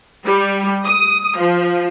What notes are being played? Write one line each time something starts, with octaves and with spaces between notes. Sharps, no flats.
G3
D#6
F3